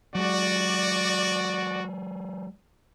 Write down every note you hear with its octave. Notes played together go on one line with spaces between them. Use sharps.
F#3 G#3 F#4 D5